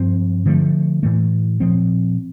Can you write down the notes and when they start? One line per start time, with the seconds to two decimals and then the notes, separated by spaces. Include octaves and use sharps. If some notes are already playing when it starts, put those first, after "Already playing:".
Already playing: G2 F3 C4
0.46 D3 F3 A3
1.03 A2 E3 A3
1.60 A#2 F3 C4